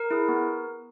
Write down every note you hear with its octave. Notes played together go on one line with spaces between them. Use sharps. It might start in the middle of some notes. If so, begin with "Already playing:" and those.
Already playing: A#4
E4 G#4
B3